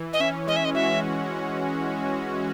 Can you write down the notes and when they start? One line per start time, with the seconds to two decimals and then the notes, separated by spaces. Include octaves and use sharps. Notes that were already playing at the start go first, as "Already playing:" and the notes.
Already playing: E3
0.13 D#5
0.20 C#4 E5
0.47 G#3 D#5
0.56 E5
0.65 D#5
0.75 F#4 E5
1.02 E3